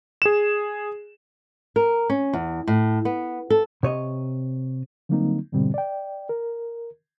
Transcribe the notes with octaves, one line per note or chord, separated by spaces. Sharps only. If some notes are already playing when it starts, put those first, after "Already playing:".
G#4 E7
A#4
C#4
E2
A2
B3
A4
C3 C#5 D#5
D3 F#3 G3 A#3 C4 D#4
G#2 B2 D3 G3 C4
D5 G5
A#4